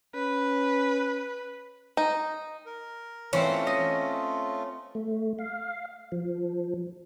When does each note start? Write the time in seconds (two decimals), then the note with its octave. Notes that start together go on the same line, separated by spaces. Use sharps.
0.15 C#4 B4
1.97 D#4
2.66 A#4
3.33 E3 A3 C4 C#4 F4
3.67 D#5
4.95 A3
5.39 F5
6.12 F3